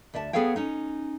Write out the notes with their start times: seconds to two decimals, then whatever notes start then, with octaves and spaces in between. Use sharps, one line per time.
0.14 D2 D5 E5 A5
0.33 B3 G#4 A4 C#5 F5 G5
0.56 C#4 D#4